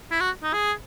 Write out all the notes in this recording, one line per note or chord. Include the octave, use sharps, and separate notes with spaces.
E4
F#4
D#4
G#4